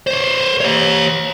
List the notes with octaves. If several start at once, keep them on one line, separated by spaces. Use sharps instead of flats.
C5 C#5
G4 C#5